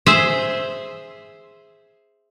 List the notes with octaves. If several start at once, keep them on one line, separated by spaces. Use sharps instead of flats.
G#4 C5 E5